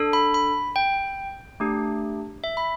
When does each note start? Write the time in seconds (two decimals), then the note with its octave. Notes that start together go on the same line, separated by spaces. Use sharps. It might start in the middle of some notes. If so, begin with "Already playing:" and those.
Already playing: D4 A4
0.13 B5
0.34 B5
0.76 G5
1.60 A3 D4 G4
2.44 E5
2.57 B5